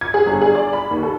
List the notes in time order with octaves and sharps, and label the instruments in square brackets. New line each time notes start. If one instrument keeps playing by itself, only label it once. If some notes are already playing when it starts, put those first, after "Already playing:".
[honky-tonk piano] G#6
G#4
G1
G#4
D5
B5
D#2
A4